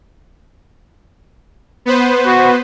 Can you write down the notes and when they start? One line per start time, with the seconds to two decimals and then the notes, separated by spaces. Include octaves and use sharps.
1.86 B3 B4 C5
2.26 F#4